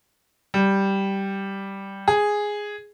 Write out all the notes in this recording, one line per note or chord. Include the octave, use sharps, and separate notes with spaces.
G3
G#4